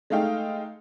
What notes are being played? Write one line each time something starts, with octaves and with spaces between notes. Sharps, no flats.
G#3 A3 D#4 F5 G5